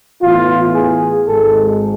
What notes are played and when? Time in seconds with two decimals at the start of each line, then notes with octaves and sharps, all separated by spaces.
0.22 A2 E3 B3 F4
0.75 G#4
1.27 G#1 G#2 G#3 A4